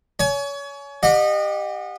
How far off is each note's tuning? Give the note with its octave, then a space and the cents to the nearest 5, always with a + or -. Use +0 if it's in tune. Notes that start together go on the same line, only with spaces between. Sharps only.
C#5 +30 G#5 +30
G4 +5 D#5 -30 F#5 -35